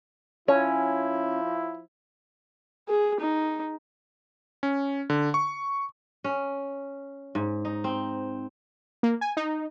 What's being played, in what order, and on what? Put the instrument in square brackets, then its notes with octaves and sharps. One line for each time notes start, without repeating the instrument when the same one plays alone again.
[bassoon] F3 [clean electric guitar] C#4 [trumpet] E4 [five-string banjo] C#5
[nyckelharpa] G#4
D#4
[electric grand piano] C#4
D3
C#6
[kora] C#4
G#2
D#4
C4
[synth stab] A#3
G#5
D#4